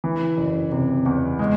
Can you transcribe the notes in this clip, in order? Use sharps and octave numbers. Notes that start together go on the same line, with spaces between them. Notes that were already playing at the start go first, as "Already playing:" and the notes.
E3
F#1
C3
E2
G#3